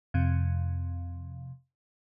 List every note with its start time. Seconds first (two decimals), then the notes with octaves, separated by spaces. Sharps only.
0.14 F2 C3